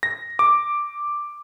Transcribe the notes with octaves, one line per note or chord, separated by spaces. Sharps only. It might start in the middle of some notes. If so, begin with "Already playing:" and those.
A#6
D6